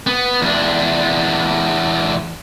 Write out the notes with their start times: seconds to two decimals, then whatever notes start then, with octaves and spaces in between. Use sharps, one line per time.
0.07 B3
0.42 E2 D4